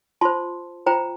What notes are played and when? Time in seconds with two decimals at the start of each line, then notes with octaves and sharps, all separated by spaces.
0.21 F4 C5 A5 C6
0.86 F4 C5 G5 A#5